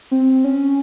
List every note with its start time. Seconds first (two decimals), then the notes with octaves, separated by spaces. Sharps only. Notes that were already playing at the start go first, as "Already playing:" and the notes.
0.11 C4
0.44 C#4